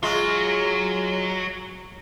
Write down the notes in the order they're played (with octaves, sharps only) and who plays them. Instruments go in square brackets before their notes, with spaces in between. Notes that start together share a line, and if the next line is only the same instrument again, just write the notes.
[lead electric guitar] F#3 [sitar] G#3 F4